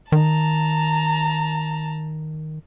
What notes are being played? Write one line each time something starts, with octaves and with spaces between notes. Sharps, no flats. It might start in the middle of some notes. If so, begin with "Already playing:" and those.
D#3 A5 A#5